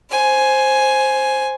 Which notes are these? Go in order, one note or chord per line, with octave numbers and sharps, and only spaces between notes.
C5 G#5